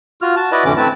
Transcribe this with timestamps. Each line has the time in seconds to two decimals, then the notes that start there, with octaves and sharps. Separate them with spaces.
0.22 F4 F#4 F6
0.36 F#4 A5
0.52 E4 F#4 B4 D5 D#5
0.65 F2 A2 D3 E3 C#4 D6
0.77 A3 C4 E4 B4 A5